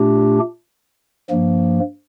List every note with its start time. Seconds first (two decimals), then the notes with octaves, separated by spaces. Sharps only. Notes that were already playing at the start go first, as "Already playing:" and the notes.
Already playing: A#2 A3 D4 G4
1.30 G2 F3 A#3